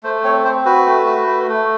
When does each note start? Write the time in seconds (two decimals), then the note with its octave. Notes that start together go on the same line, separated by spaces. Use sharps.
0.03 A3 C5
0.24 C4 C#5
0.45 C4 C5
0.65 F#4 B4
0.86 A3
1.06 F#4
1.27 A3
1.48 A3